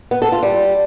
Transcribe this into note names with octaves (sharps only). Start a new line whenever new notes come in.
B3
A4
F4
G3